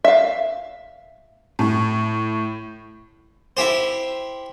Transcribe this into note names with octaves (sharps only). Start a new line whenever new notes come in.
E5 F5
A2
E4 G4 C5